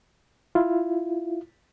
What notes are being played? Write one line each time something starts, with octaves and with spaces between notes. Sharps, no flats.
E4 F4